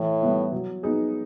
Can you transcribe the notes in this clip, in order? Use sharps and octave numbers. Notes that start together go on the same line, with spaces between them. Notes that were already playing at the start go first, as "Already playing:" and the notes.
Already playing: A2 E3
G3 B3 E4
F#3
B3 D#4 G#4